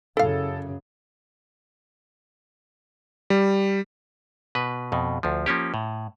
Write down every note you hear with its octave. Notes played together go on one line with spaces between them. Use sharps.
F#2 C#3 E4 A4 F5
G3
B2 B4
F2 B2
D2 F3
F3 A#3 C#4 G4
A2